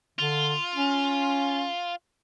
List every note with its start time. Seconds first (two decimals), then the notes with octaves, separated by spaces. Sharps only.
0.19 D3 F4
0.75 C#4